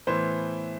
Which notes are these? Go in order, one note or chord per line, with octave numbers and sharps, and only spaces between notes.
A2 E3 B3 C5